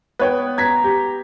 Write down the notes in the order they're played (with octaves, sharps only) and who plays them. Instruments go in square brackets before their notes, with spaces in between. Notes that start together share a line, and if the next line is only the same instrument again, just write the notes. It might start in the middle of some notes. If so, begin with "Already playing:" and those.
[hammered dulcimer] B3 [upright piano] B4 C#5 G5
[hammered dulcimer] A#5 [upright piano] G#6 B6
[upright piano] G4